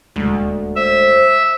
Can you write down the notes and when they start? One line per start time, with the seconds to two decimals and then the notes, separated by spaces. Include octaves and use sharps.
0.16 D#1 D2 G#3
0.76 C5 E5